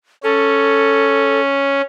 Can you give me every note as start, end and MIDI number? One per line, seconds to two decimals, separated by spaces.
0.24 1.82 61
0.24 1.41 69